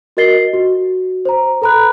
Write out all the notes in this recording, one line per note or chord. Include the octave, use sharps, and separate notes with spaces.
F#4 A#4 D#5 A6 C7 G7
F#4
C5 A#5
A4 B4 A#5 B5 F#6